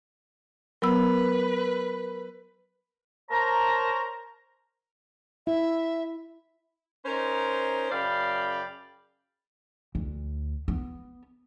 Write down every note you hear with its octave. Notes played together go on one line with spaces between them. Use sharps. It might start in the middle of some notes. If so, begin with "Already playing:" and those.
F#3 B3 A#4 B4 B5 E6
A#4 C5 C#5 A5 A#5
E4 E5
C#4 D#4 A#4 C5
F#2 C#3 D5 F5 G5 B5
D2
B3